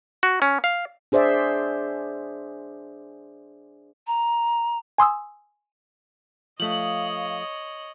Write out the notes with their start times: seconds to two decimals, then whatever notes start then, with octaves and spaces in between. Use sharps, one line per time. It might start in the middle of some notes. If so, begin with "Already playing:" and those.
0.23 F#4
0.42 C#4
0.64 F5
1.12 D4 G#4 C5 D5 E5
4.07 A#5
4.98 G#5 C6 D#6 E6
6.60 F3 A3 C#5 D#5 F5 D#6 F#7